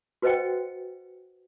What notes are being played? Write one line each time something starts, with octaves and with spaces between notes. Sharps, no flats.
F#4 B4 C5 D#5 F#5 G5